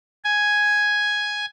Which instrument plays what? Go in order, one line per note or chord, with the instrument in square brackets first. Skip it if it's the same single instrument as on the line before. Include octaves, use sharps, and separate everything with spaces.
[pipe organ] G#5